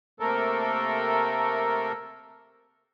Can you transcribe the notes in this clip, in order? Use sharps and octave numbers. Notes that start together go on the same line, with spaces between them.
C3 A3 A#3 A4 A#4